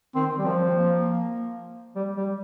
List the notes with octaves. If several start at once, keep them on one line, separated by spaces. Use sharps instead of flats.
D#3 C4
G3
F3 C4
A#3
G3
G3